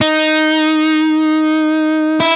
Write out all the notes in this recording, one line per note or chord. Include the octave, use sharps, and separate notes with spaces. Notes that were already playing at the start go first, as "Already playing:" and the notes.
D#4
E4